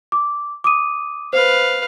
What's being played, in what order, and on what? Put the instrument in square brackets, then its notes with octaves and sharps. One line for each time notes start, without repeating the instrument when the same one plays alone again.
[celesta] D6
D6 D#6 D#7
[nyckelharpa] B4 F5 [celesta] C5